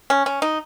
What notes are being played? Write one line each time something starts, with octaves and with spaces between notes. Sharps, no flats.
C#4
C#4
D#4